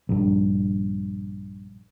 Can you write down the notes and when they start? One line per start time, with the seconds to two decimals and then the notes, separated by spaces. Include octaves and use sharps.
0.09 A#1 G2